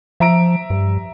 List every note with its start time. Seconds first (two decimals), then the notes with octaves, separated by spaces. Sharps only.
0.20 F3 E5 A#5 D7
0.70 G2